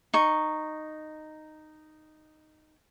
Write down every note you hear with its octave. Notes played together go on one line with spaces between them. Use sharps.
D#4 C#6